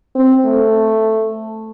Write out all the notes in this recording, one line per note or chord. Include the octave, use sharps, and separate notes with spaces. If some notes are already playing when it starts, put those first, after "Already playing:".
C4
A3